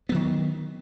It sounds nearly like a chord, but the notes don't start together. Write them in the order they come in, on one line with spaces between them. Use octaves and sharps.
B3 F#3 D#3